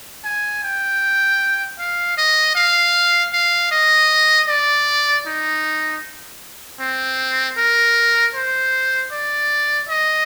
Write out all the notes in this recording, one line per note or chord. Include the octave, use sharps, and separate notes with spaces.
G#5
G5
F5
D#5
F5
F5
D#5
D5
D#4
C4
A#4
C5
D5
D#5